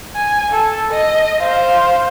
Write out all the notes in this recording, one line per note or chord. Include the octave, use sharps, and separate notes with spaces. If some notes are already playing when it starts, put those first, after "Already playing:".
G#5
A4
D#5
C5 F5